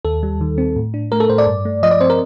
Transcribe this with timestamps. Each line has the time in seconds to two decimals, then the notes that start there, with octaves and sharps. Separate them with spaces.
0.05 D#2 A4
0.23 G3
0.41 D#3
0.58 C4
0.76 A2
0.94 D4
1.12 A3 A#4
1.20 A4
1.29 A2 C5
1.38 D5
1.47 G2
1.65 A3
1.83 F3 D#5
1.91 D5
2.01 C4 C5
2.10 A#4